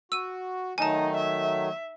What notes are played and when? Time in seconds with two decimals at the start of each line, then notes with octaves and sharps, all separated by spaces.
0.12 F#4 E6 D#7
0.78 D#3 F#3 A3 D#4 G#5 A5
1.17 E5